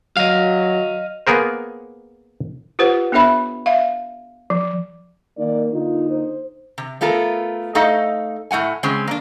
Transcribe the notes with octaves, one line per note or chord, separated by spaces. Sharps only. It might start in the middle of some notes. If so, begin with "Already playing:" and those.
F#3 D#5 F5
A#3 B3 G#4 A#4 C5
F4 G4 B4 C5 F#5
B3 D4 A4 C#5 E5 B5
E5 F5
F3
D#3 A#3 D5
D3 A#3 D#4 F4
C5
C3
A3 B3 F4 A4 A#4
A3 D#4 A4 D#5 F5
A2 A3 F#5 G#5
C#3 G#3 C4 C#4
A#3 D4